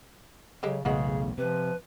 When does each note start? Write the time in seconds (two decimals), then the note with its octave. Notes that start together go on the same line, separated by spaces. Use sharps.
0.63 C#3 F#3 G#3 G4 A4
0.85 B1 E2 A2 C#3 G#3 B3 F#4 G#4
1.38 C3 F3 B4